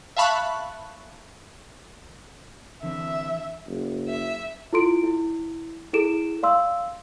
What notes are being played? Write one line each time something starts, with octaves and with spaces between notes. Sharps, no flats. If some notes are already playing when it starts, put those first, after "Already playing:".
E5 F5 A5 B5 C#6 F#6
D3 E3 C4 E5
F#1
E5
E4 F4 A4 C6 D7
E4
E4 G#4 A4 D7 E7
D5 F5 C6 E6